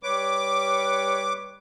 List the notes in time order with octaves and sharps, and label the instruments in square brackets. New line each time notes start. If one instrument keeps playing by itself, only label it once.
[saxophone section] G3 B4 C#5 [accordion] D6